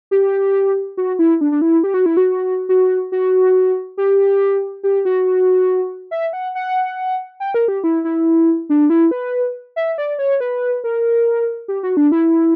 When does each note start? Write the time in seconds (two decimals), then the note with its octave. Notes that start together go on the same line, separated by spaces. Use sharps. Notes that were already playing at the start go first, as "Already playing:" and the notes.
0.11 G4
0.97 F#4
1.19 E4
1.41 D4
1.52 D4
1.62 E4
1.83 G4
1.94 F#4
2.06 E4
2.17 F#4
2.69 F#4
3.12 F#4
3.97 G4
4.83 G4
5.05 F#4
6.11 E5
6.33 F#5
6.55 F#5
7.40 G5
7.54 A#4
7.68 G4
7.84 E4
8.04 E4
8.69 D4
8.90 E4
9.11 B4
9.76 E5
9.98 D5
10.19 C#5
10.40 B4
10.84 A#4
11.68 G4
11.83 F#4
11.97 D4
12.12 E4